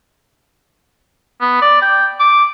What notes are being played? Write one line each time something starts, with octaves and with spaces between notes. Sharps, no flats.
B3
D5
G5
D6